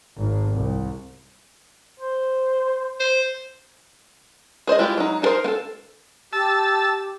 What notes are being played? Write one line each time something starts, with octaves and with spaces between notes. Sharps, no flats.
G#1
C2
C5
C5
G#4 C5 D5 D#5
G#3 E4 F4 G4
F#3 D#4
D#4 F#4 A4 A#4 C5
B3 A4
G4 A5 E6